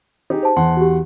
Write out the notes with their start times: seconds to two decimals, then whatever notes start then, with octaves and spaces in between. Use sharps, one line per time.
0.30 D#4 G4 G#4
0.43 C5 A5
0.56 E2 F#5 C6
0.77 F#4 G4